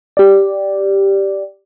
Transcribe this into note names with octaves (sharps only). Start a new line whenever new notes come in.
G4 D5